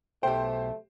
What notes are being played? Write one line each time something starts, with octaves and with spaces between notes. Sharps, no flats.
B1 A3 G4 C5 G5